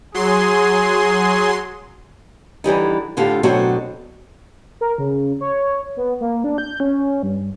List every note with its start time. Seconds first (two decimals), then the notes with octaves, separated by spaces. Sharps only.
0.14 F#3 G#4 C6
2.64 D3 E3 G3 D#4
3.17 A2 D3 F4 G4 A4
3.43 B2 D3 F#3 A3 C4 F#4
4.81 A#4
4.98 C#3
5.41 C#5
5.97 B3
6.21 A#3
6.44 D4
6.58 G6
6.80 C#4
7.23 G2